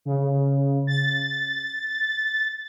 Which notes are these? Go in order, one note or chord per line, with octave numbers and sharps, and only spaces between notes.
C#3
A6